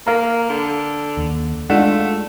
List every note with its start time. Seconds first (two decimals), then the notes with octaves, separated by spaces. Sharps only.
0.07 A#3 A#4 F5 A#5
0.50 D3
1.17 D#2
1.70 G#3 A3 D4 D#4 F4 F#5